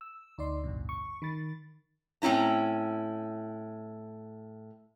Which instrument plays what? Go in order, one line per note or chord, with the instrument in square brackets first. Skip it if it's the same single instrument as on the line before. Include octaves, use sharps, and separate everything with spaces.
[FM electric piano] E6
D2 D#4 D5 C6
A1 D2 G2 B2
C#6
D#3 B5 A6
[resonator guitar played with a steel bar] A2 C4 C#4 E4 A#5